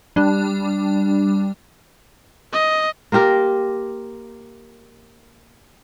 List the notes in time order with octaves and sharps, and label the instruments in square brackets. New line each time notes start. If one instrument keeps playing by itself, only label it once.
[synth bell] G3 D4
[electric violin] D#5
[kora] A#3 F4 G4 A#4